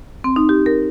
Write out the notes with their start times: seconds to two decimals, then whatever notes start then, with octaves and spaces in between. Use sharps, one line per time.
0.24 C4
0.36 D#4
0.49 G4
0.66 A#4